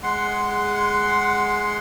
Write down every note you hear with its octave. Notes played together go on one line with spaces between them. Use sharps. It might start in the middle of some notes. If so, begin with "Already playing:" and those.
G#3 F#5 C6